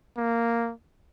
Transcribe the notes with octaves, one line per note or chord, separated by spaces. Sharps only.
A#3